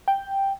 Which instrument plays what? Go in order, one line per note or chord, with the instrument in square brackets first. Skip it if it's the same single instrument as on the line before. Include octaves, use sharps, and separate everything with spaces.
[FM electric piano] G5